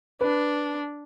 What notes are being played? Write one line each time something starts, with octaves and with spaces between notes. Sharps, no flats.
D4 B4